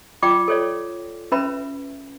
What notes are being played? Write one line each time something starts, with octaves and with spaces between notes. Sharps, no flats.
F4 D5 G5 D6
A4 C#5 D5
C#4 B4 E5 B5